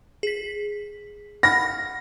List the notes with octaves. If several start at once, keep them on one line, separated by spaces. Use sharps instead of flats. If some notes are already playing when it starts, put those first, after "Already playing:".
G#4 B6
F#5 B5 F6 A#6